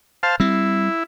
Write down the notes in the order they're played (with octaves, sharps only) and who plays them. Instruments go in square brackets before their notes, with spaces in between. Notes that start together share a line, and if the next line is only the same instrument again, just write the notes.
[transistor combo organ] C5 F5 A5
[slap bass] G3 C4 [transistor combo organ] E4